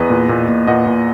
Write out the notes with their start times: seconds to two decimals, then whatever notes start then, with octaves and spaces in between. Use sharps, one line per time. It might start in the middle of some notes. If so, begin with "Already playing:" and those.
Already playing: E2 B4 D#5
0.10 A#2
0.29 A#2
0.48 A#2
0.67 A#2 D#5 F#5
0.87 A#2